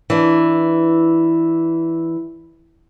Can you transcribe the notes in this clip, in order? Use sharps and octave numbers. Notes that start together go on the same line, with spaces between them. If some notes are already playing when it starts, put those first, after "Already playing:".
E3 D4